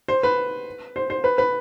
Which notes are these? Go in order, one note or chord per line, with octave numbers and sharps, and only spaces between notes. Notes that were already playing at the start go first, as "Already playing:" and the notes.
C5
B4
C5
C5
B4
B4